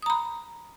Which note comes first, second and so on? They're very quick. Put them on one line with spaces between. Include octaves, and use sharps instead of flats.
D#6 A#5 B5